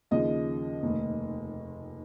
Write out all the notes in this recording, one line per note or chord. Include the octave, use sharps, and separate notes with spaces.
D#2 C#3 F3 D#5
F1 D#2 D#3